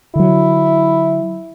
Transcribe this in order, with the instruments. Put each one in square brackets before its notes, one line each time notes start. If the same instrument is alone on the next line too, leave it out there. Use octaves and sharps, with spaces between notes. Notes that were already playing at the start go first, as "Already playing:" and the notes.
[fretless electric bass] D3 F#3 [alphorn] E4